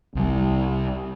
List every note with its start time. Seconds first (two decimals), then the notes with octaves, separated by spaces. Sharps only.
0.15 C2 G3